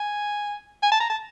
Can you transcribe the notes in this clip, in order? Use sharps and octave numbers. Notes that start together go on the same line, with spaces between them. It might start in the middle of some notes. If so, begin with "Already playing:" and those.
Already playing: G#5
G#5
A5
A#5
A5